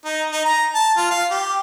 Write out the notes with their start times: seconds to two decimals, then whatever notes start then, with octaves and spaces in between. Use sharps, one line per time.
0.05 D#4
0.32 D#4
0.46 A#5
0.75 A5
0.97 F4
1.11 F5
1.31 G4